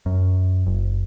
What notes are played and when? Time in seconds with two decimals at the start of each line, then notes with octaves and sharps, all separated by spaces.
0.06 F#2
0.66 F#1